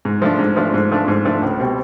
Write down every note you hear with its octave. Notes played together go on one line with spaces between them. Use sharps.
G#2
F3 A3 D4
G#2
F3 A3 D4
G#2
F3 A3 D4
G#2
F3 A3 D4
C#2
B2 G3 C4